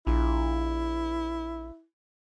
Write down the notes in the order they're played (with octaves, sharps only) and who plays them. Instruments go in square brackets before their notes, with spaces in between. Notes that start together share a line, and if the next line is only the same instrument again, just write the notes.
[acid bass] A#1 [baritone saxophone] E4